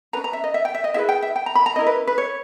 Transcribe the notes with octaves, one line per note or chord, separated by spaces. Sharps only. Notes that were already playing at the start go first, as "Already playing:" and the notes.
C#4 G#4 B4 A#5
A#5
E5
D#5
E5
G5
E5
D#5
E4 G#4 B4 E5
G5
E5
G5
A#5
B5
A#5
C#4 E4 A#4 D#5
B4
B4
C#5